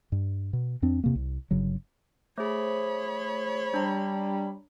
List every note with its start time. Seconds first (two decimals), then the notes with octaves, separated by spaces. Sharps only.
0.12 G2
0.53 B2
0.82 F2 C4 D4
1.04 E2 C3 A#3
1.15 C2
1.51 G1 C#3 F#3
2.38 A3 G#4 C5 C#5 B5
3.74 G3 D4 A#5